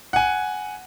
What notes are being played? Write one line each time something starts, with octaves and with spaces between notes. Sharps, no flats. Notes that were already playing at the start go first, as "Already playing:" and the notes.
F#5 G#5